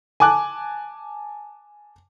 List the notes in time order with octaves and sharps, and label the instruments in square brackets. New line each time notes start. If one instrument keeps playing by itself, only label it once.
[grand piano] G#5 A5 D6 F#6